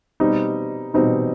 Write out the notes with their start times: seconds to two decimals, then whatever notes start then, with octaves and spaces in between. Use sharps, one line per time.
0.20 B2 G3 C4 D#4
0.94 B2 G3 C4 D#4